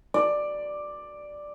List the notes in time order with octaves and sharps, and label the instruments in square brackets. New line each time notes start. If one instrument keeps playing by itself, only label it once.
[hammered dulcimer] D5